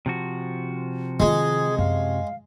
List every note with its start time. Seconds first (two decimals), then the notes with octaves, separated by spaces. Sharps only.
0.06 C3 F3 F#4
1.20 D#3 G#3 F4 G#4
1.78 F#2 F5